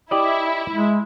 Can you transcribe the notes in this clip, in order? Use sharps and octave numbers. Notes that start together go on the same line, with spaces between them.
E4 G4 D5 D#5
G#3